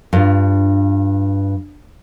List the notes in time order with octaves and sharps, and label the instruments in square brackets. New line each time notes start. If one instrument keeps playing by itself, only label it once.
[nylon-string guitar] G2 F4